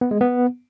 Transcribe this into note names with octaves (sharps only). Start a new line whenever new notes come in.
B3
G#3
B3